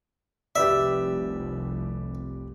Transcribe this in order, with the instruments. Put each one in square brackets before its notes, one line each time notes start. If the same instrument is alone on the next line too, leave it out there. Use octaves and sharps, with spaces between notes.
[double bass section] F1 C2 [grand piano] G4 B4 D5 [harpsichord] E5